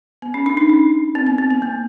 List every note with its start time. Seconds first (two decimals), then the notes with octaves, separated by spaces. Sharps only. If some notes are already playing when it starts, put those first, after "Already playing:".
0.22 B3
0.34 C#4
0.46 D4
0.57 D#4
0.69 C#4
1.15 C4
1.26 B3
1.38 C4
1.51 B3
1.62 A#3